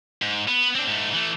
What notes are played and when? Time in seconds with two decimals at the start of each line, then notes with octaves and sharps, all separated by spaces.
0.22 G#2
0.48 B3
0.76 C4 D4
0.88 G#2 A3
1.13 E3 A3